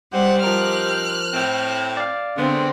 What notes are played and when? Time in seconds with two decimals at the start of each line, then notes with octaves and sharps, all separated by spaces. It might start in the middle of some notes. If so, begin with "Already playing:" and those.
0.13 G3 C4 D#4 G4 C5 F#5
0.44 F3 A#4 F6 F#6
1.34 A2 C4
1.97 D5 F5
2.37 D3 G#3 A3 B3 C4